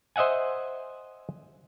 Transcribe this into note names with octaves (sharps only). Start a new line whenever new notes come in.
C5 D#5 E5 F#5 G#5